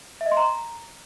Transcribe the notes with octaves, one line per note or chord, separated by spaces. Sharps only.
E5
D#5
C6
A#5